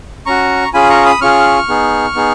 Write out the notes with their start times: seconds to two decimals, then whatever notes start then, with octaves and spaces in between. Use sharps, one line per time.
0.26 C#4 F#4 A#5 C#6
0.74 C#4 F4 G#4 G#5 B5
0.90 A#5 C#6
1.06 B5 D#6
1.21 C#4 F4 G#4 C#6 F6
1.68 B3 D#4 G#4
2.15 B3 D#4 G#4